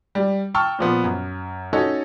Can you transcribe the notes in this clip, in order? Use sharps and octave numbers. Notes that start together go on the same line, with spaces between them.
G3
G5 A5 C#6 E6 F6
A#2 F3 B3
F#2
C#4 D#4 F#4 A4 C#5 D#5